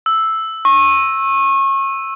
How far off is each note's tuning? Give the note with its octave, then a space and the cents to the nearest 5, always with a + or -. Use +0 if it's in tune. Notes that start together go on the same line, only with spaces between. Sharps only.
E6 +0
C#6 -30